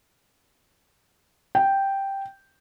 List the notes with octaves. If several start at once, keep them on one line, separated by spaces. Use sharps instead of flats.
G5